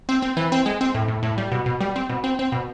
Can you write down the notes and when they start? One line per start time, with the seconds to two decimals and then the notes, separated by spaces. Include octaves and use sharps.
0.09 C4
0.22 C4
0.37 E3
0.52 C4
0.66 G#3
0.81 C4
0.95 A2
1.08 A2
1.23 A2
1.38 G3
1.52 B2
1.66 B2
1.80 G3
1.96 C4
2.09 B2
2.24 C4
2.39 C4
2.52 B2